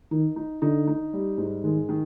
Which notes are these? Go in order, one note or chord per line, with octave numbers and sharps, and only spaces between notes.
D#3 D#4
D#4
D3 D#4
D#4
G3
G#2
D#3 G#3
D#3